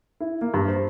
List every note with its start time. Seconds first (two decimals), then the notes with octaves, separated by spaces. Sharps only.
0.20 E4
0.41 A#3
0.54 G2
0.68 C5